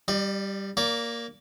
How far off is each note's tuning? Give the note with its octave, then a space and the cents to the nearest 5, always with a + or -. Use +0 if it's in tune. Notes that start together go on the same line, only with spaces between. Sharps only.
G3 +0 D5 +45
A#3 +0 D5 -30